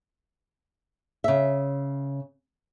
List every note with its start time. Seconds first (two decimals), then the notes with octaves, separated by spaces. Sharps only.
1.24 C#3 E5